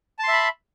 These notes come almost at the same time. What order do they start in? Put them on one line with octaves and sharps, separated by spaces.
A5 C6 E5 B5